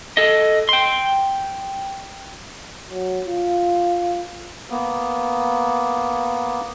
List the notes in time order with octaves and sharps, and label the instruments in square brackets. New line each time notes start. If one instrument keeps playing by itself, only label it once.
[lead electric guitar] A4 D#5
G5 C6
[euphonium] F#3
F4
[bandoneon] A#3 B3